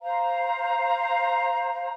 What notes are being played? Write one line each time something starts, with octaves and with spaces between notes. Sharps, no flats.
C5 F5 A#5